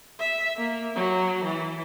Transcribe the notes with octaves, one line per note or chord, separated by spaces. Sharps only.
E5
A#3
F#3
E3